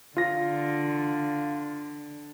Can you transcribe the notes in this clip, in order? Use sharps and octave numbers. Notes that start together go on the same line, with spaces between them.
D3 F4 A#6